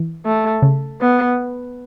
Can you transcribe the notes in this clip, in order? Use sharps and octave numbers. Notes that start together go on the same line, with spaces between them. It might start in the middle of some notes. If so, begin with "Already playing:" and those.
Already playing: E3
A3
C#3
B3